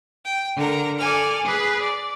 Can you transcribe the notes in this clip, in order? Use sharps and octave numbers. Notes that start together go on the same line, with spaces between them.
G5
D3 A#4 A#5
A4 D5 G#5 F6
G#4 B4
D5